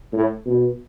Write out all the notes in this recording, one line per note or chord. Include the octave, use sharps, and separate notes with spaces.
A2
B2